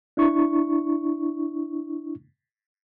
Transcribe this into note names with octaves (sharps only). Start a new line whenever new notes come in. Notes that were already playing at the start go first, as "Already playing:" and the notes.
D4 E4 C#6